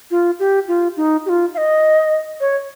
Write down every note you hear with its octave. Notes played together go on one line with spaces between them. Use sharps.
F4
G4
F4
D#4
G4
F4
F5
D#5
C#5